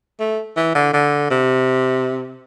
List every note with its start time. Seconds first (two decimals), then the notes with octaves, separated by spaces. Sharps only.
0.20 A3
0.57 E3
0.75 D3
0.94 D3
1.30 C3